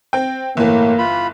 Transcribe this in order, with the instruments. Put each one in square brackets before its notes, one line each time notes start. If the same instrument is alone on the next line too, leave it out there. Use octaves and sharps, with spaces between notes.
[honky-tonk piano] C4 G5
[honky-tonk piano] G1 E3 [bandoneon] A2 [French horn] A#3
[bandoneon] F4 B5